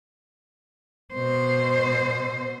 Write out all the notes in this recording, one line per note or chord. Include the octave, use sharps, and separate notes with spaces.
B2 C5